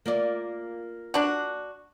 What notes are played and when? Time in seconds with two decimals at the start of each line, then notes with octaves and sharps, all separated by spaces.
0.06 A#3 F4 D5
1.14 D4 F#4